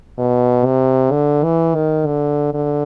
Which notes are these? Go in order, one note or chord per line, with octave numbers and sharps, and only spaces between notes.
B2
C3
D3
E3
D#3
D3
D3